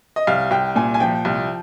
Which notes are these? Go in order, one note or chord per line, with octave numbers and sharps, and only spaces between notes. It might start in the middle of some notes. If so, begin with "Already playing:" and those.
D#5
C2 F5
C2 G5
A#2 G#5
G#5
F3 G5
C2